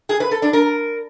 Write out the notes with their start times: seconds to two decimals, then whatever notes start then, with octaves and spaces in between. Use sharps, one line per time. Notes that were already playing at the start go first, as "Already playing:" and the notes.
0.09 G#4
0.20 B4
0.31 A4
0.42 D4
0.53 A#4